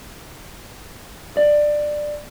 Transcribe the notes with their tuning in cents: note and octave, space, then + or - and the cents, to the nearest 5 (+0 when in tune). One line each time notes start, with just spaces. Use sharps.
D5 +15